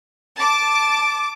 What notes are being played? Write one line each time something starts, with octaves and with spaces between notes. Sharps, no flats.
A5 D6